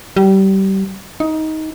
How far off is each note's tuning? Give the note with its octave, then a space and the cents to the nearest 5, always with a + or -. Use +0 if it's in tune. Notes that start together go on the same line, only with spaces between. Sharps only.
G3 -25
D#4 +15